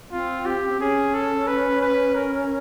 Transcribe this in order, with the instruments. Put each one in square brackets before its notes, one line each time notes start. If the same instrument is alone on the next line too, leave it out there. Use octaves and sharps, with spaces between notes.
[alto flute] C4 [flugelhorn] F4
[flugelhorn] G4
[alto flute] C4
[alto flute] C#4 [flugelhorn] G#4
[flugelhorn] A4
B4
B4
A#4